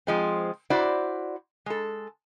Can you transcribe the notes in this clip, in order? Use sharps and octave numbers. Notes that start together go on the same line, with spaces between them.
F3 G#3 C4
E4 F#4 C5 D5
G#3 A4